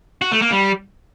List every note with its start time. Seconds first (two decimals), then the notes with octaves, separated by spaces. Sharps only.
0.22 F#4
0.32 A3
0.42 A#3
0.52 G3